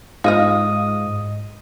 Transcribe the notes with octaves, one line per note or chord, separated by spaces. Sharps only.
G#2 F4 D#5 F5 D#6